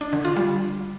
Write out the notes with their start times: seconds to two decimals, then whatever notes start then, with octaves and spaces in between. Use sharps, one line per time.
0.01 D4
0.13 D3
0.25 F4
0.37 G3